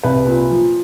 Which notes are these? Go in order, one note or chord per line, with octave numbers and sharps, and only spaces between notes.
C2 B4
A#2
F3